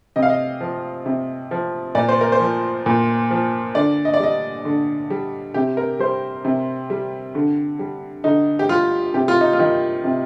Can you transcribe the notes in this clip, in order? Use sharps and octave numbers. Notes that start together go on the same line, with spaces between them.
C3 D#5
F5
D#5
F3
C3
F3
A#2 D5
C5
A#4
C5
F3
A#2
F3
D3 D5
D#5
D5
G3 D#5
D3
G3
C3 G4
A#4
G3 C5
C3
G3
D3
G3
D3 D#4
G4
G3 F4
C3 G4
F4
D#4
F4
D#3 G3
C3